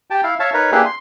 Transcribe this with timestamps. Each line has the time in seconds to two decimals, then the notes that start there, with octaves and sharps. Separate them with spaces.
0.10 G4 G5 A5
0.23 E4 F5
0.40 C#5 E5 F5 A5
0.54 D#4 A#4 B4 C#5
0.72 A#3 D4 E4 G4 G#4 B4
0.85 C6